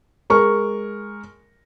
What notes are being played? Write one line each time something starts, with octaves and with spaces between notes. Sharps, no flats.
G#3 A#4 C#6